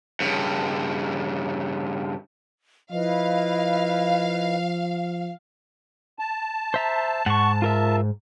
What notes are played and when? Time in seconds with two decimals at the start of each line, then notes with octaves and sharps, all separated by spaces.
0.20 G2 C#3
2.92 F3 E4 B4 D#5 F5
6.19 A5
6.74 C5 E5 A#5
7.26 G#2 F#5 C#6
7.62 F4 A#4 E5